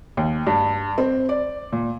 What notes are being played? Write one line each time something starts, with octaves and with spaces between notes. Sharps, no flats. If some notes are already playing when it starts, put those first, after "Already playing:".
D#2
G2
C4
D5
A#2